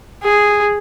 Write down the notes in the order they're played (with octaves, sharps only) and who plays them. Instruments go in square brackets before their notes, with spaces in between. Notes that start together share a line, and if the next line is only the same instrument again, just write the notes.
[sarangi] G#4